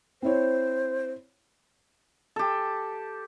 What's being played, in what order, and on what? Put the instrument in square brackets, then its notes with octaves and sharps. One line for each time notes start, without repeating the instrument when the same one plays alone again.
[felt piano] C4 E4 C#5 [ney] C5
[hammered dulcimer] G4 A4